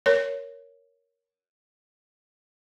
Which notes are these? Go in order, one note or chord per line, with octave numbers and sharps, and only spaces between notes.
A#4 C#5